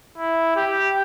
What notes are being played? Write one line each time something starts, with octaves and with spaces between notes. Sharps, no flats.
E4
G4